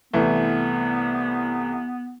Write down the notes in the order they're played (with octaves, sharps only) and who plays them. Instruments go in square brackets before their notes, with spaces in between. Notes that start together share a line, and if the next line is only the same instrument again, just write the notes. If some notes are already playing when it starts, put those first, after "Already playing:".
[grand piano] C2 E3 A3 [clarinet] B3